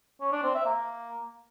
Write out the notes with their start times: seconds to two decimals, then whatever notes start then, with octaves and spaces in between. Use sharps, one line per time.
0.21 C#4
0.32 D4
0.43 C4
0.54 E5
0.66 A#3